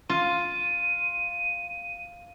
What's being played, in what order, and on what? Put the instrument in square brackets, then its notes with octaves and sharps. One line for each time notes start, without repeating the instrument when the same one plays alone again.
[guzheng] F4 [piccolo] D#7